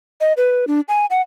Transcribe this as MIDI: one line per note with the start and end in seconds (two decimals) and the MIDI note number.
0.21 0.33 75
0.37 0.65 71
0.67 0.80 62
0.89 1.06 80
1.10 1.21 78